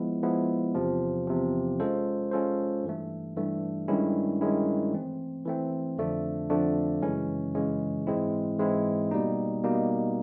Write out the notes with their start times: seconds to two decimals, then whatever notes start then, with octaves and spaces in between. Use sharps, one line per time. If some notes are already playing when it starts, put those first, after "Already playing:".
Already playing: F3 G#3 B3 E4
0.23 F3 G#3 B3 E4
0.75 E2 C3 F3
1.27 E2 C3 F3
1.80 G#3 C#4 F4 A4 C5
2.31 G#3 C#4 F4 A4 C5
2.84 G2 E3 A3
3.37 G2 E3 A3
3.88 G2 D#3 G#3 C#4 E4
4.41 G2 D#3 G#3 C#4 E4
4.93 E3 A3 C4
5.45 E3 A3 C4
5.98 F2 D3 F3 A3 D4
6.50 F2 D3 F3 A3 D4
7.02 F#2 C#3 E3 G#3 C#4
7.55 F#2 C#3 E3 G#3 C#4
8.07 G#2 E3 G#3 C4 E4
8.59 G#2 E3 G#3 C4 E4
9.11 B2 G3 A#3 D#4
9.64 B2 G3 A#3 D#4